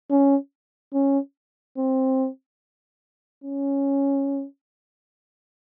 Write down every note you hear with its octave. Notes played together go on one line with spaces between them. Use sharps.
C#4
C#4
C4
C#4